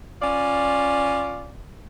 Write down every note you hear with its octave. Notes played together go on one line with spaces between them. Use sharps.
C#4 F4 D5